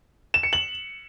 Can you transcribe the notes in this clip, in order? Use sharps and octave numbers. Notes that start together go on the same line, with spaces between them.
E7
C#7
F#7